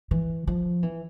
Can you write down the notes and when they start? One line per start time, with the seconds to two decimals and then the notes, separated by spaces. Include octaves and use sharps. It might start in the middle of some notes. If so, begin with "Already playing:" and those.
0.11 E3
0.47 F3
0.83 E3